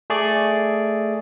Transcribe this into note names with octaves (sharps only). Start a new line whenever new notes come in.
A3 G#4 D5